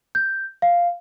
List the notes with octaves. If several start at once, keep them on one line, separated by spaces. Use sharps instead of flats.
G6
F5